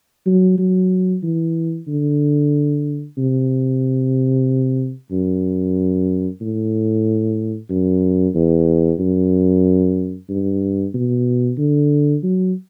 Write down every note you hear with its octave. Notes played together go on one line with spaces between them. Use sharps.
F#3
F#3
E3
D3
C3
F#2
A2
F#2
E2
F#2
G2
B2
D3
F#3